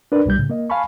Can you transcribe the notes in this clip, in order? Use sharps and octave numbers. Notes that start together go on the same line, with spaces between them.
D4 A#4 B4 D5
C2 A#2 G3 G6
A2 C#3
A#3 D#5
F5 G#5 A5 B5 C#6